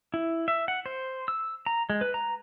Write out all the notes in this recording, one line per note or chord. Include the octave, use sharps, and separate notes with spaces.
E4
E5
F#5
C5
E6
A#5
G#3
B4
A#5